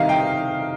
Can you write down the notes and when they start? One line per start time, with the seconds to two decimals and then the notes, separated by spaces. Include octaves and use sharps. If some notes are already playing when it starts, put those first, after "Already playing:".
Already playing: C3 D#3 G3 D#5 F5
0.09 G5